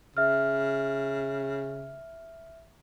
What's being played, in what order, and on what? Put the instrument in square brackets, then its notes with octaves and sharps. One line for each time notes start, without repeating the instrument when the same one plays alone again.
[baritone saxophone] C#3 [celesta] E5 F6